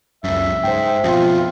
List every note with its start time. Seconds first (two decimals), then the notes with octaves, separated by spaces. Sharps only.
0.24 C#2 F#2 E5
0.63 G#2 C5 G5
1.04 F2 B2 F4